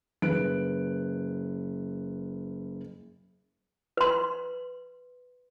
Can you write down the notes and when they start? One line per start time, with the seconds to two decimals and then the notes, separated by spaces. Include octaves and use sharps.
0.22 F#1 B4 F#6 D7
3.97 B4 C6